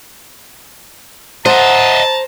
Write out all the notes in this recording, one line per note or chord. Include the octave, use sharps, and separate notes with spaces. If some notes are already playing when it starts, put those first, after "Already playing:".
C5 D#5 E5 F#5 A5 A#5